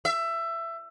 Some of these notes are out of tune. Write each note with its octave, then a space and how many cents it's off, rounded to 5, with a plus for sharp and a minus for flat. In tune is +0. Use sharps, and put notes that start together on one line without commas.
E5 +20